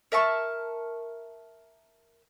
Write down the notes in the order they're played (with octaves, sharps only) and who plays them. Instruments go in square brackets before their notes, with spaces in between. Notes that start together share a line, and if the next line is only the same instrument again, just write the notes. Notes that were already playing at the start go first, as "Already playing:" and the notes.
[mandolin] A#4 E5 A5 C#6